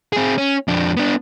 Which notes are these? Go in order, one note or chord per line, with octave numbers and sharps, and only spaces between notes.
C4 G#4
C#4
F2 D4
B3 D4